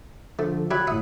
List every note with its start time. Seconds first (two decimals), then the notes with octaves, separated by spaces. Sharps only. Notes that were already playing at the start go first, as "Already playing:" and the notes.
0.39 D3 F3 A3
0.71 F#3 E4 G4 B5 F#6 G#6
0.87 G1 A2 E5 F#5 D#6